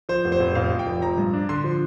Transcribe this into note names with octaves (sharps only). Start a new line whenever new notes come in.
F3 C5
F1
C5
F1
F2 F5
F3
G5
F1
F3 A#5
G2
D4
D3 C6
F3